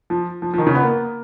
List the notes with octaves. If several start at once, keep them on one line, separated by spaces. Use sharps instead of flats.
F3
F3
F3
D#3
C#3
B3
A#3